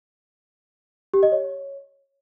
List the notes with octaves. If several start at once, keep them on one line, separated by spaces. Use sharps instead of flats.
G4
D#5
C#5